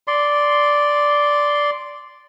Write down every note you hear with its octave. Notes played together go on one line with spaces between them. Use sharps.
D5 C6